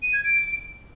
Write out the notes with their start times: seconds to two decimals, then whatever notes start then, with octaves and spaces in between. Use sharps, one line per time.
0.02 D#7
0.13 G#6
0.24 D7